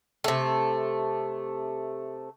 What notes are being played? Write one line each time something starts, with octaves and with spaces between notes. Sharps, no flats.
C3 A3